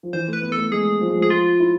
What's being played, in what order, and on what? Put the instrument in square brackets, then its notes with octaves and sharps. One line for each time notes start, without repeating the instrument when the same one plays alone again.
[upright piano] F3
[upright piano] E3 [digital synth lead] C5
[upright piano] A3
[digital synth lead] B4
[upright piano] B3
[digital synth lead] A4
[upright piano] A3
[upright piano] G#3 [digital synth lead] G#4
[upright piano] F3
G#3
F3
[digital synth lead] G#4
[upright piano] F3 [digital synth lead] F4
[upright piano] E4